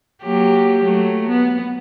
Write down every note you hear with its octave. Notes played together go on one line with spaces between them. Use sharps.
F#3 A#3 G4
F#3 A3
B3